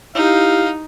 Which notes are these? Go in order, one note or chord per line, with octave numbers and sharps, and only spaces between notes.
D#4 E4 G4 F5